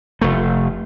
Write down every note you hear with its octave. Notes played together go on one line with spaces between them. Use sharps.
F1 A3